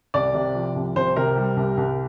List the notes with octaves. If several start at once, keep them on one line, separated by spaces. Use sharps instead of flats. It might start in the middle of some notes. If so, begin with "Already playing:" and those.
C2 D5
C3
F3
C2
C2 C5
C3 A#4
G3
C2
C2